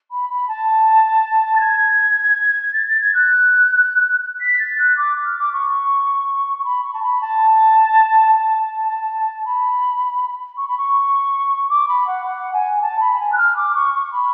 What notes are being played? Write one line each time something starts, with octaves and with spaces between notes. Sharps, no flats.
B5
B5
A5
A6
G#6
G#6
A6
A6
G#6
F#6
B6
A6
F#6
D6
F6
D6
C#6
C#6
B5
C#6
A5
B5
A5
A5
B5
C#6
B5
C#6
D6
B5
F#5
F#5
G#5
A5
B5
G#5
F#6
F6
D6
C#6
C#6
B5